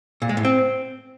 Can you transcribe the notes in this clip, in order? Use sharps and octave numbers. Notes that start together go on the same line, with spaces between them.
A#2
G#3
A2
C4